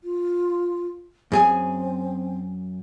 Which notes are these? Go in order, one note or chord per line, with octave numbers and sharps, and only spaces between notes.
F4
F#2 C4 G#4 G#5